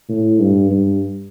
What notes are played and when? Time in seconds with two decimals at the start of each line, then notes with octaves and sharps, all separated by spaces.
0.09 A2
0.40 G2
0.70 G2